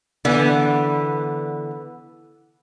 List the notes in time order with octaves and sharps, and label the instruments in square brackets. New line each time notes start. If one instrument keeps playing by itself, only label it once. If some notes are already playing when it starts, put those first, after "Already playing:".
[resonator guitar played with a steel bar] D3 E3 B3